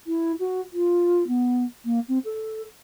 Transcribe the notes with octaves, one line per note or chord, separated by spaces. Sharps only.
E4
F#4
F4
B3
A#3
C4
A4